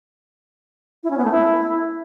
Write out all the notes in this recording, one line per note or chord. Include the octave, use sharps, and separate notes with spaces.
E4
C#4
B3
A3
E4